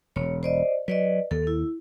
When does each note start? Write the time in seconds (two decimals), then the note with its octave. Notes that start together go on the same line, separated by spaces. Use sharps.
0.16 E1 C#5
0.43 C5 D5 D#5
0.88 F#3 B4 D5 D#5
1.31 D#2 A4
1.47 E4